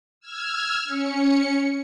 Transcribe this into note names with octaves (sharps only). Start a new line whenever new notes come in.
E6 F6 G#6
C#4 C#7